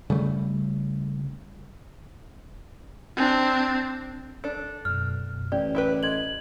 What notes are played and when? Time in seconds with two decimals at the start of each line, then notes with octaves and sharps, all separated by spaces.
0.10 C#3 G3 A3
3.17 C4 D4
4.44 D4 A4
4.85 F#2 B2 F6
5.52 A1 G4 D5
5.75 E4 G4 B4
6.03 A4 D#5 C6 G#6 F#7